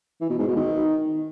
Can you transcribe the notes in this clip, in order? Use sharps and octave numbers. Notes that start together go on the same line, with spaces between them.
E3
B2
G#2
B2
D#3